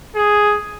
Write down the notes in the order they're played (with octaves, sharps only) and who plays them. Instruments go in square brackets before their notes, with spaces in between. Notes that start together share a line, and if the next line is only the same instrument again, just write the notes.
[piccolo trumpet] G#4